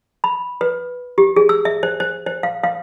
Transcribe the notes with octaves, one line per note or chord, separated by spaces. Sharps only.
B5
B4
G4
G#4
E6
E5
C5
C5
C5
F5
F5